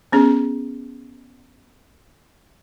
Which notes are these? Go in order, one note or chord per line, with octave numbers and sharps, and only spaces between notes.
B3 C#4 G#4